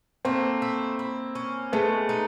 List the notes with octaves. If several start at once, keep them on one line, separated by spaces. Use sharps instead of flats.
A3 A#3 C4
E4
E4
C#4
G#3 A3 B3
D#4